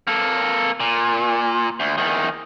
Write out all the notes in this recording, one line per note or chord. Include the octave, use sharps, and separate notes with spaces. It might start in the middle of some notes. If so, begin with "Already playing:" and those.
A#3 A4
A#2
D2
E2 D#3